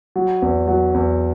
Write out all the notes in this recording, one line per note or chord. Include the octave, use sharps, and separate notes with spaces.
F#3
E2
F#3
E2